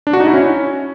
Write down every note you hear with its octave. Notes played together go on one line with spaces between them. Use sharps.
D4
F#4
D#4
E4
C#4